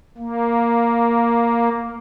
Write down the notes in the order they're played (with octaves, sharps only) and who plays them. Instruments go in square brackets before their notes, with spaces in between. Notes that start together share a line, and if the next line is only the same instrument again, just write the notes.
[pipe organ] A#3